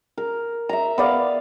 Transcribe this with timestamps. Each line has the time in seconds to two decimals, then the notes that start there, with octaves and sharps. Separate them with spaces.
0.18 A#4
0.69 E5 A#5
0.98 B3 D5 F5